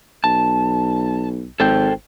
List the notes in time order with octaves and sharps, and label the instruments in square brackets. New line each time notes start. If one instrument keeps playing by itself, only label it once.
[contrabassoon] B1 [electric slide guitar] A5
[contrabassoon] G#1 [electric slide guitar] A4 C5 G5